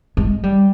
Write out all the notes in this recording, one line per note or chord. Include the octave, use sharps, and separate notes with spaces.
G#3
G3